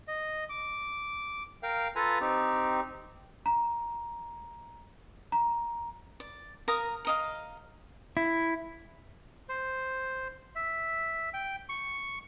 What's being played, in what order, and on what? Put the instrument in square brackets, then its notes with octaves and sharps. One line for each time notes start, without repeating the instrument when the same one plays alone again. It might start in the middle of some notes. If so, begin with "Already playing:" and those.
[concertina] D#5
D6
A#4 F5 G5
F4 A4 B4 G#5 A#5
C4 D#4 G4
[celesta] A#5
A#5
[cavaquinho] D5
A#4 F5 A#5 D#6
A#4 D#5 F5
[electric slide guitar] E4
[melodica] C5
E5
G5
C#6